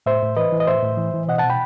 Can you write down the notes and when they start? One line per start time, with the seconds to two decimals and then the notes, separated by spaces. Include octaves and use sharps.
0.06 A2 C5 E5
0.22 A2
0.37 E3 B4 D#5
0.52 E3
0.60 D#5
0.67 A2 C5 E5
0.83 A2
0.98 E3
1.14 E3
1.28 B2 D#5 F#5
1.38 F#5 A5
1.44 B2
1.50 G5 B5